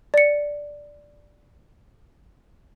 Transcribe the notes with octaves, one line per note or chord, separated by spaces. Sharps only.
D5 C#7